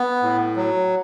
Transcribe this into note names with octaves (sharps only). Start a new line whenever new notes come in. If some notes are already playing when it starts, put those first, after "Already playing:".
Already playing: B3
A2
F#3